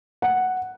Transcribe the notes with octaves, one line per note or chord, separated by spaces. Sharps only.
F#5